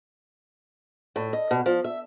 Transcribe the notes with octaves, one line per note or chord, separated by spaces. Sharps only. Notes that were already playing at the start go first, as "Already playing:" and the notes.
A2
D#5
B2
F3
E5